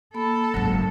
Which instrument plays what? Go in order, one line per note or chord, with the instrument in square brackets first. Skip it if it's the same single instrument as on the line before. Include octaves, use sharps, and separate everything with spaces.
[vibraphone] A#3 B5 [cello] A4
[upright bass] F#1 G#2 [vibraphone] F#3